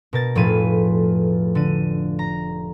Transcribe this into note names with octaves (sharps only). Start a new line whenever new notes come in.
B2 A#4 A6
F1 A2 F3 G#4 B4 D#7
D3 D#7
A#5